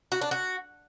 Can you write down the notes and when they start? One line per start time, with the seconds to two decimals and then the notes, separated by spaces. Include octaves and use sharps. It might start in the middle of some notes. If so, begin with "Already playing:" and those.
0.12 F#4
0.21 D4
0.31 F#4